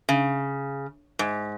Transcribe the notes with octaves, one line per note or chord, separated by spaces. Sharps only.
C#3
G#2